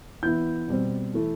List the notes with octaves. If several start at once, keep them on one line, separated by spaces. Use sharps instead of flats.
E3 B3 E4 G6
B2 G3 C4
E3 A3 E4